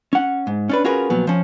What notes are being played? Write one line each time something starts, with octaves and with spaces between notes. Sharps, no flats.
C#4 F#5
G#2
C#4 D4 B4
C#4 F4 F#4 G#4 A#4 B4
A#2 F3 F#3 B3
F3 C#4